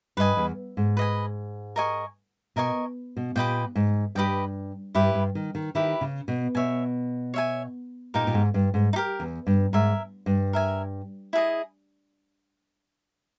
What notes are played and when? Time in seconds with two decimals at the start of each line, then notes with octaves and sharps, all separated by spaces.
0.17 G2 B4 D#5 G#5
0.37 E2
0.77 G#2
0.97 B4 D#5 G#5
1.76 A#4 D#5 G#5 C#6
2.56 B2 A#4 D#5 G#5 C#6
3.17 B2
3.36 A#2 G4 B4 D#5 G5
3.75 G#2
4.15 G2 G4 B4 D#5 G5
4.95 G2 E4 G4 B4
5.15 G2
5.35 D#3
5.55 D#3
5.75 D#3 E4 G4 B4
6.01 C#3
6.28 B2
6.55 B2 C#5 E5 G#5
7.34 C#5 E5 G#5
8.14 A#2 D#4 G4 A#4
8.27 A#2
8.34 G#2
8.54 G2
8.74 G#2
8.93 D#4
8.96 G4 A#4
9.20 E2
9.47 G2
9.73 G#2 A#4 E5 G#5
10.26 G2
10.53 A#4 E5 G#5
11.33 E4 G#4 D#5